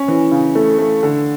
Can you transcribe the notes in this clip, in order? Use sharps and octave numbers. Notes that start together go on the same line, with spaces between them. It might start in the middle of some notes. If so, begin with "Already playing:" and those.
Already playing: C#4
E3
C#3
A3
A3
D3